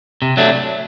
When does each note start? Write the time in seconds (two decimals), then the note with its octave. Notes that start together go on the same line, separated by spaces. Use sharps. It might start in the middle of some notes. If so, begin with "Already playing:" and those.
0.22 C3
0.37 F#3 A3 D4